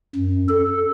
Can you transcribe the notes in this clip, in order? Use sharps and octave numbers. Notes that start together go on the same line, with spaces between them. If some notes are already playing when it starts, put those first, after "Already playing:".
F#2
A4